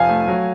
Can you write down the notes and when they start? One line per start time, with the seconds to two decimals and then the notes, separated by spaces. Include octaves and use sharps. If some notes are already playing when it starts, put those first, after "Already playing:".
Already playing: F1 F3 F5 G#5
0.09 A3
0.28 F#3